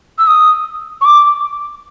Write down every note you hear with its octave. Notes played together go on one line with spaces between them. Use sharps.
E6
D#6
C#6
D6